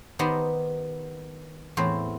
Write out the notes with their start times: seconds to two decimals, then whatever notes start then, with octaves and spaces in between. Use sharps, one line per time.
0.19 D#3 B3 G4 C5 A#5 B5
1.77 E2 A2 C4 C5